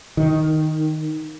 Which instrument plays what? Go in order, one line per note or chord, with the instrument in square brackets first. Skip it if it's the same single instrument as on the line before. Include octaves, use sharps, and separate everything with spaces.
[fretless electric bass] D#3